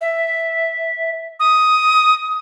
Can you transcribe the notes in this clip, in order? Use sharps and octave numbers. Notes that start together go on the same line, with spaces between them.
E5
D#6